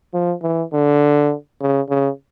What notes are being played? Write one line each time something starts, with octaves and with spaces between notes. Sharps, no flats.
F3
E3
D3
C#3
C#3